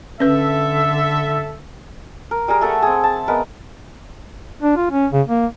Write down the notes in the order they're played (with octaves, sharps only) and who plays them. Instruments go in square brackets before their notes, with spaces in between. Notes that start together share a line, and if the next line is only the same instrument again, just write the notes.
[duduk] D3 [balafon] C#4 B4 [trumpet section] A4 E5
[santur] A#4
G3 G#4 A#4
A3 A4 E5 F#5
C4 G#4
A5
G#3 B3 A#4 B4
[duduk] D4
F4
C#4
C#3
A#3